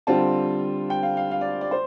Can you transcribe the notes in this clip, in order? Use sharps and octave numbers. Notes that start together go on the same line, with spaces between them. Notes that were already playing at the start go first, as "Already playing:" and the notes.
D3 G3 C4 F4 A5
G5
F5
F5
F5
D5
D5
C5